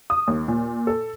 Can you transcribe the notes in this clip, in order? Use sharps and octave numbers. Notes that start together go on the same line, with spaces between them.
D#6
D#2
A#2
A4